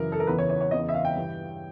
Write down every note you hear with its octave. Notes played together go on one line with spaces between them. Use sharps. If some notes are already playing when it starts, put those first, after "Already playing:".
Already playing: F#2 C#3 E3 A#4
A4
A#4
E2 C#3 E3 B4
C#5
C#5
C#5
E2 C#3 E3 D#5
E5
F5
G5
G2 E3